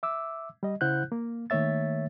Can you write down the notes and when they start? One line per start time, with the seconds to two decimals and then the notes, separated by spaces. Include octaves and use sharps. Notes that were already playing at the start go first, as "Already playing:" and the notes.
0.03 E5 D6 E6
0.63 G3 D#5
0.81 C#3 E4 C5 F#5 F#6 G6
1.12 A#3
1.50 D#3 A3 A#3 C#5 E5 A6